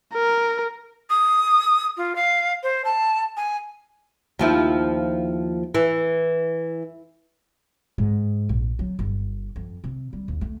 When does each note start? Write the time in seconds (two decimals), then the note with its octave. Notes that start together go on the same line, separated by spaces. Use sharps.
0.14 A#4
1.09 D#6
1.97 F4
2.15 F5
2.63 C5
2.84 A5
3.36 G#5
4.39 D#2 F3 E4
5.75 E3
7.98 G#2
8.49 A#1
8.79 F#3
8.99 G1
9.56 F2
9.84 C3
10.13 G3
10.28 D#2
10.41 A3